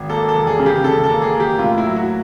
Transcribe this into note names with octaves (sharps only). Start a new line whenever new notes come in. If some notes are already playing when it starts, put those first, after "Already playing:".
Already playing: G#1
A#3 A4
A4
E2
G#4
C#3
G4
C#3 A4
A4
A#3
G#4
A#3
G4
A2 F4
E4
F#3
F#4